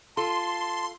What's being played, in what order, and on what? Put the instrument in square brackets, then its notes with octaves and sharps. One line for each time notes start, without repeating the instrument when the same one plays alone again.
[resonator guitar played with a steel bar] F4 A4 [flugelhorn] A5 [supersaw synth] C6